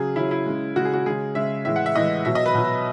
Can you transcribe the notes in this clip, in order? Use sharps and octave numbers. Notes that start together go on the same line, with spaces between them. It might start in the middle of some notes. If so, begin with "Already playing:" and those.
Already playing: C#3 F#3 G#4
C#3 F#3 E4
E4
C#3 G#3
C#3 G#3 F#4
G#4
F#4
C#3 G#3 G#4
C#3 G#3 E5
A2 E3 G#3 E5
F#5
E5
A2 E3 G#3 D#5
B2 F#3 E5
D#5
B4
B2 F#3